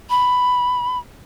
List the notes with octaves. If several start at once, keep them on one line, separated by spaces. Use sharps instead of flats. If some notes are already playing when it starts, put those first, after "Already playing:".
B5